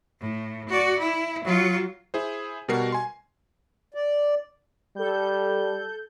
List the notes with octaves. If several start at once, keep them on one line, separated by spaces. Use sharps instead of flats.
A2
F#4 D5
E4
F#3 F4
E4 G#4 C5
B2 G3 F#4 A#4 C7
G#5 C6
D5
G3 A4 G6